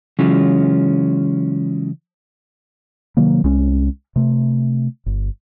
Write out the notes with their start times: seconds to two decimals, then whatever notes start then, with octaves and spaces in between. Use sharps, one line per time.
0.19 C#3 E3 F#3 G#3 C#4 F4
3.17 C3 D#3 F#3 A#3
3.44 C2 G#3 C#4
4.16 C3 A3
5.06 G1